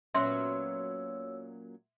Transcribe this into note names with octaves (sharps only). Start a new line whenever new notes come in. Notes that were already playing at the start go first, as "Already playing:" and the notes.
A#2 F#3 B3 C#4 C#5 E5 C6 E6